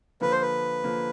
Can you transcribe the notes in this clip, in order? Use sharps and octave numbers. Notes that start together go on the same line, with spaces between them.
D3 F3 A#3 B4
C5
B4
D3 F3 A#3